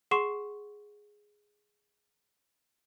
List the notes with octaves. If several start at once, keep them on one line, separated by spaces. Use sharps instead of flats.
G#4 F#5 C6 C#6 C7 E7